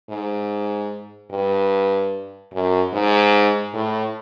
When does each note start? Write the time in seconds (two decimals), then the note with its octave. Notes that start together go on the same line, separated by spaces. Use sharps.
0.10 G#2
1.31 G2
2.53 F#2
2.93 G#2
3.74 A2